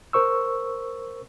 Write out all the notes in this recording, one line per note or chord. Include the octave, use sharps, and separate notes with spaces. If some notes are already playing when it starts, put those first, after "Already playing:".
A#4 C5 C#6 E6